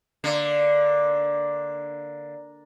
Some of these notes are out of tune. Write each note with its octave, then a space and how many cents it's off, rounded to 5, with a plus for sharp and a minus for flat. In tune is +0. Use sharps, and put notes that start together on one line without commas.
D3 +0 A#3 +0